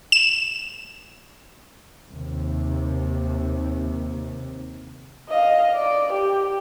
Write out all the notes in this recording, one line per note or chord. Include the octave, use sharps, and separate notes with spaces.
E7
D#2 C3
D#5 F5
D5
G4